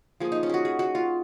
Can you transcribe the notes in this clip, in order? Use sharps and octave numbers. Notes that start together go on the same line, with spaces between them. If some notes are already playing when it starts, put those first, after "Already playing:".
F3 A#3 G#4
D#4
C#4
F#4 G#4
G#4
F#4
F4